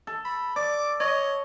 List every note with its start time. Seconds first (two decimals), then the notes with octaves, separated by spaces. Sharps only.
0.07 A4
0.25 B5
0.56 D5 D6
1.00 C#5 D#5